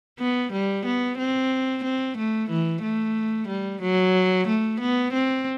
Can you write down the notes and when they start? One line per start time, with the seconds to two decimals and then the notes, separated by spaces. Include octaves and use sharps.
0.19 B3
0.52 G3
0.85 B3
1.18 C4
1.84 C4
2.17 A3
2.50 E3
2.82 A3
3.48 G3
3.81 F#3
4.47 A3
4.80 B3
5.13 C4